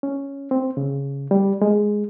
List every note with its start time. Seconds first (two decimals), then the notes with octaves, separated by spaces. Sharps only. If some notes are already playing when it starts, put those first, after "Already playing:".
0.03 C#4
0.51 C4
0.77 C#3
1.31 G3
1.62 G#3